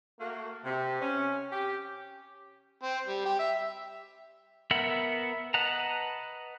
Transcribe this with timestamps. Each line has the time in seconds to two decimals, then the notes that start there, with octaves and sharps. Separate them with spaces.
0.19 A3 A#3 F#4
0.64 C3
1.01 C#4
1.51 G4
2.83 C4
3.07 G3
3.25 G4
3.39 E5
4.71 B3 A#4 E5 F#5 B5
5.54 B4 D#5 F#5 A5 A#5